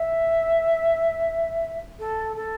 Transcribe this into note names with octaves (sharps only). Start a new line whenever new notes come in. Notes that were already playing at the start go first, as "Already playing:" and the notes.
Already playing: E5
A4
A4